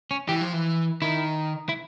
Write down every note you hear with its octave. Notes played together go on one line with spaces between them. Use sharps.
C#4
E3 G4
F3
E3
D#3 E4
E4